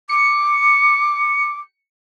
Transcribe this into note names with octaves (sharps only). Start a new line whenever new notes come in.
D6 C#7